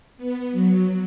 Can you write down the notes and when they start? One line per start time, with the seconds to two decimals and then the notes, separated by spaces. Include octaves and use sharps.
0.17 B3
0.52 F#3